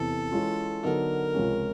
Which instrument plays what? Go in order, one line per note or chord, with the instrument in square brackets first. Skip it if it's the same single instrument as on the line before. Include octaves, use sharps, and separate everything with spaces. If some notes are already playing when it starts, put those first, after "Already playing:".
Already playing: [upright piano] E2 C3 E3 [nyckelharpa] A4
[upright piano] E3 G#3 C#4 F4
[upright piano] D3 F#3 B3 D#4 F#4 [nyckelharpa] A#4
[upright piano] C#2 C3 F3 G#3 C#4